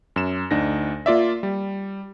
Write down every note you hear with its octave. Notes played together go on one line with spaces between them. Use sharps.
F#2 E7
D2 D4 D#4 A#6
A#3 F4 D5 E5
G3